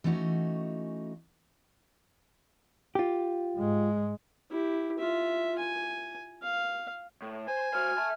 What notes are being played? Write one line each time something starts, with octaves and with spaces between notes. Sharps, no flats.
E3 A3 C#4 D#4 F#4
F4 G4
G#2 G#3
E4 G4
F4 E5
G#5
F5
A2
C5 G#5
F#4 C5 F6
E5 A5